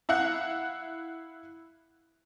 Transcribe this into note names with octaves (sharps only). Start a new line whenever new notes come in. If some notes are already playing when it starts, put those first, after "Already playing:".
E4 F5 F#5 F#6